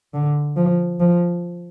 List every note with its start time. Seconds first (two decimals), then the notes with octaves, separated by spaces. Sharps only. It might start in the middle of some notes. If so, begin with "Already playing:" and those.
0.14 D3
0.56 F3
1.00 F3